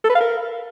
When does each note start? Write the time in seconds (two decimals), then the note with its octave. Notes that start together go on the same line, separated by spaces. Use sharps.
0.04 A4
0.10 B4
0.15 F5
0.21 A#4